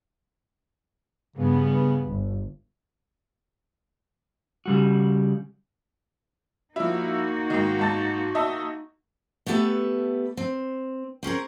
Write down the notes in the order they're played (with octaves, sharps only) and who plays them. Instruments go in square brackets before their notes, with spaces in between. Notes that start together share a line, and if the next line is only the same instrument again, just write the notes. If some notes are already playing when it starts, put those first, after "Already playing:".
[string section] G2 B3 [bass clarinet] C#3
[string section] G1
[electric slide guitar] C#3 G3 F#4
[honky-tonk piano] F3 E4 [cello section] A#3 D#4 F#4
[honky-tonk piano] G#2 D#3
G#2 A5 A6
D#5 E5 A5
[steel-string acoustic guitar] A3 B3 G4 A4 B4 E5
C4
C4 C#4 G#4 A#4